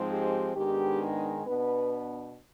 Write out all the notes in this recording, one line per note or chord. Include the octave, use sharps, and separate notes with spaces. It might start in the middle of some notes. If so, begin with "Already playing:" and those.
Already playing: G#2 F3 G#3 C4
G4
G#2 D#3 G#3 B3 D4 G4
G#4
B2 B3 D4 B4